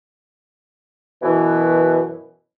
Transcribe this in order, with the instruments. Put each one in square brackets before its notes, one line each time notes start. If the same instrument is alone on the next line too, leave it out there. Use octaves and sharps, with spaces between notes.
[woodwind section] F#2 B2 E3